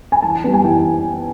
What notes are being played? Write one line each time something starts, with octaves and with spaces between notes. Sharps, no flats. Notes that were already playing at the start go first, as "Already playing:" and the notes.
G#5
E3 A5
G3 B3
G#5
E3 G5